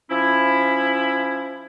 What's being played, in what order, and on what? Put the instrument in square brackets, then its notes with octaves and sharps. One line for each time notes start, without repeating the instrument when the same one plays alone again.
[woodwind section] F3 C#4 E4